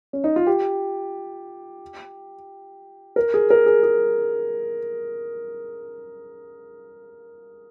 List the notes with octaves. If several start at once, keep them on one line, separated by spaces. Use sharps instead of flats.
C#4
D#4
F4
G4
A#4
G#4
A#4
G#4
G#4